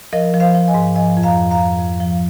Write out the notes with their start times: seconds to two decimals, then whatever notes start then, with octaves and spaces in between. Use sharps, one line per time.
0.13 F3 A#4 D#5
0.34 F3
0.40 C5 F5
0.54 F3
0.68 D#5 G#5
0.74 G#2
0.96 F3 D#5 G#5
1.17 F2
1.23 F5 A#5
1.37 F2
1.51 F5 A#5
1.58 F2
1.79 F2
2.00 F3